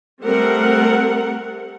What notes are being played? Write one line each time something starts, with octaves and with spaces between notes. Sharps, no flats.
G3 A3 C4 A#4 F#5